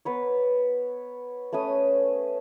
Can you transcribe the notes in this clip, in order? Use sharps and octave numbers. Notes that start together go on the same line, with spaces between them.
B3 B4 C#5
A3 C#4 B4 D#6